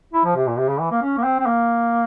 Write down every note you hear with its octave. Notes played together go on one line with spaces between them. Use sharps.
E4
F3
C3
A#2
C3
C#3
E3
A#3
C#4
A#3
C4
C4
A#3